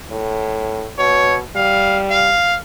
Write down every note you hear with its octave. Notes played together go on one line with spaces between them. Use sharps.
A2
B2 C#5
G3 F5
F5